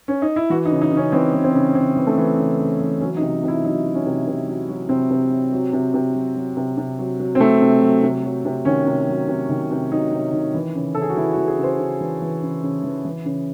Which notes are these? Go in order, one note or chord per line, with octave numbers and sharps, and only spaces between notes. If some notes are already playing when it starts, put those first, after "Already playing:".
C#4
D#4
E4
E3 F#4
D#4
C#3
D#4
C#3
C#4
E3 C4
E3
C4
C#3
C#3 C4
E3
A3
E3
C#3
C#3
E3
F#3 C#4
D#4
C3
C3 E4
F#3 D#4
F#3
C#4
C3
C3
F#3
F#3
C3 C4
C3
F#3
F#3
C3
C3
F#3
F#3
C3
C3
F#3
F#3
C4
C3 A3
C3
F#3
C3
F#3
C3
D#3 C#4
C3
F#3
C3
D#3
C3
F#3 D#4
C3
D#3
E3
C#3
C#3 A4
G#4
F#4
E3 E4
F#4
E3
G#4
C#3 C5
C#3
E3
E3
C#3
C#3
E3
E3
C#3